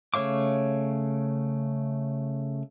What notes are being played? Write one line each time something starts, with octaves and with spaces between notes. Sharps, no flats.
C#3 A3 C#5 F5 D6